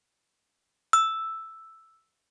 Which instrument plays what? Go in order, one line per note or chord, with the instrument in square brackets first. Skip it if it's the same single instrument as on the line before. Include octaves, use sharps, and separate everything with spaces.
[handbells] E6